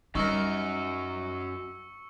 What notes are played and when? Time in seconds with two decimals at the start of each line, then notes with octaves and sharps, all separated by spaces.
0.15 F#2 G3 D#4 A#4 C#6 E6 C#7